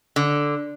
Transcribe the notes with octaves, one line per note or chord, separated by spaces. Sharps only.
D3